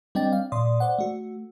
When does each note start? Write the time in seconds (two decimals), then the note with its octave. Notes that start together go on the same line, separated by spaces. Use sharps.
0.15 G3 C4 D4 D#5 G5 A6
0.33 F5
0.52 A#2 D5 C6 D#6
0.80 C5 D5 F#5
0.98 A3 F#4